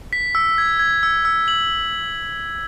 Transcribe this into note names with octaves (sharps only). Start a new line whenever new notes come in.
B6
E6
G#6
G#6
E6
E6
F#7